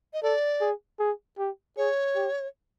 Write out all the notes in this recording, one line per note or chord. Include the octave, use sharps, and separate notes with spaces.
D#5
A4 D5
G#4
G#4
G4
G#4 C#5
G4